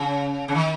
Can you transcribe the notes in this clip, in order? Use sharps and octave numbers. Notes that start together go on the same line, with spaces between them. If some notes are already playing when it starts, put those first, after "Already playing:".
Already playing: C#3
C#3
D#3